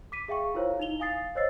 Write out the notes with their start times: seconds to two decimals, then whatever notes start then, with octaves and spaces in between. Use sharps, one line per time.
0.12 D6 B6 D#7
0.28 G#4 E5 F5 G5 C#6
0.54 E4 F4 A#4 C5 C#5 F5
0.80 D#4 E4 F7 G7
1.00 F5 G#5 D#6 A6 C7
1.35 C5 C#5 D#5 E6 A6 C7